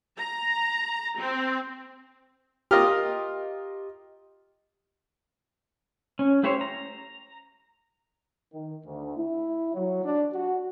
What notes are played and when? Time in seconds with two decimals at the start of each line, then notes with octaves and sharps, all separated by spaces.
0.18 A#5
1.18 C4
2.71 F4 G4 A#4 D#5 F6
6.19 C#4
6.43 A3 E4 G4 C5 C#5
6.61 A#5
8.53 D#3
8.85 D2
9.17 E4
9.74 F#3
10.03 D4
10.33 F#4